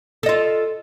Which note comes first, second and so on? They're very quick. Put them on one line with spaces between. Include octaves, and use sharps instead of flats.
A4 D#5 F4